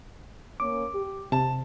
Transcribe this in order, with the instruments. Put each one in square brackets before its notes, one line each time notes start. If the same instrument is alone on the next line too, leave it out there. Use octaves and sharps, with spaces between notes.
[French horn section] A#3 C#4 [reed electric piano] D6
[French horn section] G4
[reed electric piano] C3 [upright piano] A5